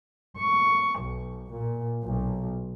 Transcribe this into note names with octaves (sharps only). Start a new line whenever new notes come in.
C#6
B1
A#2
B1